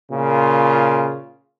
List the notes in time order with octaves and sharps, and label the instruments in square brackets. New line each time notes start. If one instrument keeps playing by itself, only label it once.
[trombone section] A#2 C#3 F4